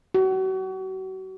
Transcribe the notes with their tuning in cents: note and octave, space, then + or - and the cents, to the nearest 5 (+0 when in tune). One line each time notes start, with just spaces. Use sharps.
F#4 +35